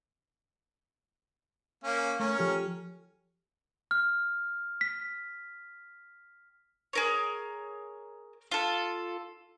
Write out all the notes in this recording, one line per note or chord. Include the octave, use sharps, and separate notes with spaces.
A#3 C#4
A3 C#4 A#4 C#5
F3 G4 A4
F6
B6
G#4 A#4 C#5
F4 A4